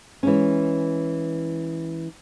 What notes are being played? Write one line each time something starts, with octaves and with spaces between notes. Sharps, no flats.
E3 G#3 C#4